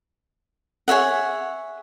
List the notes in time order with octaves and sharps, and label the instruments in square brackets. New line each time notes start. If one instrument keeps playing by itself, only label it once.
[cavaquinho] G#4 C#5 E5 F#5